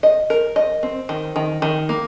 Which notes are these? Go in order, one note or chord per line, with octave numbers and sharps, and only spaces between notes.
D#5
A#4
D#5
C4
D#3
D#3
D#3
A#3